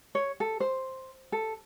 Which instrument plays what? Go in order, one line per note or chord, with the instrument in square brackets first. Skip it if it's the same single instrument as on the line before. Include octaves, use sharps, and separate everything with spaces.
[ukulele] C#5
A4
C5
A4